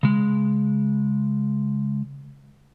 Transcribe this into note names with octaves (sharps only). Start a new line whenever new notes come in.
C#3 G#3